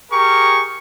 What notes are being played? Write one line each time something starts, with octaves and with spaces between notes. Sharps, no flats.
G4 G#4 A#4 C#6